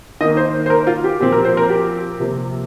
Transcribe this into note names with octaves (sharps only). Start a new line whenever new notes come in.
D#3 A#3 D#5
C5
C5
A#4
F4
G4
A#2 F3 C4 G4
A#4
C5
A#4
G4
C3 F3 A#3